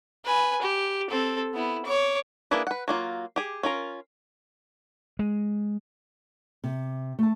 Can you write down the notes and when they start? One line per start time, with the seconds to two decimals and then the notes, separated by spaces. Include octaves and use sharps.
0.25 B4 G#5
0.61 G4
1.10 C4 A4
1.54 B3 E4
1.85 C#5 D6
2.51 A#3 D4 E4 G#4 B4
2.67 B4 F#5
2.88 F#3 A#3 F4
3.36 G4 G#4
3.63 C#4 F4 A#4
5.19 G#3
6.64 C3
7.19 A3 A5